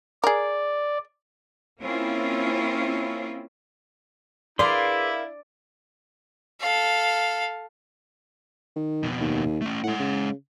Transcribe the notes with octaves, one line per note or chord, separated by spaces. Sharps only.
G#4 A#4 D5
A#3 C4 C#4 E4 F4
E4 G#4 A#4 B4 D5 E5 F5 C6
A4 F5
D#3
F2 B2
D#2
A3 C#4
A2 G#3 F#5
C#3